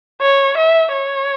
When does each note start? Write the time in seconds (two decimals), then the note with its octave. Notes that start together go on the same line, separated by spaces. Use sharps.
0.22 C#5
0.57 E5
0.92 C#5